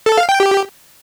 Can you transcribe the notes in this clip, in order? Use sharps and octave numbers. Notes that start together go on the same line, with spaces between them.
A4
F5
G5
G4